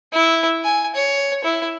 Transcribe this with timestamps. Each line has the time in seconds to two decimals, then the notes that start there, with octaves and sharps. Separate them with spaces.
0.13 E4
0.65 G#5
0.95 C#5
1.44 E4